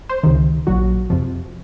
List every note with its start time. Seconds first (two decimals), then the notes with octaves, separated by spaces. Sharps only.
0.09 C5
0.23 C#2 C3 D#3
0.67 A#1 A#2 F#3 F#4
1.10 F2 C3 F3